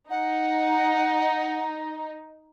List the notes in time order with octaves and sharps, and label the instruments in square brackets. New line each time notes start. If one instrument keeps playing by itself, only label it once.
[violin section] D#4 [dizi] F#5